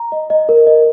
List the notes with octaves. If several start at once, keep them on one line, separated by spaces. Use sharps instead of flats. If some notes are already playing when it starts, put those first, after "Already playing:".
Already playing: A#5
D#5
D#5
A#4
D#5